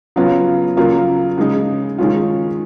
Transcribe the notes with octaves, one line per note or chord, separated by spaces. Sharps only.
C#3 F#3 B3 F4
C#3 F#3 A#3 F4
C#3 G#3 D#4
D#3 G#3 C#4 F4